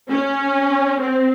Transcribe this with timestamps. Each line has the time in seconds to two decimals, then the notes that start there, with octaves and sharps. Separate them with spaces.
0.10 C#4
1.00 C4